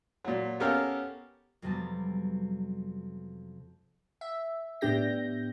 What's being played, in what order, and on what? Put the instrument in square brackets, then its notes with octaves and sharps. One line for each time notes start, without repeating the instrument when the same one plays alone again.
[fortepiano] A#2 F#3
B3 C#4 G4 A4 A#4 F5
[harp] F2 C3 F#3 G3 B3 A5
[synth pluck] E5
A2 B3 D4 G4 G6 A#6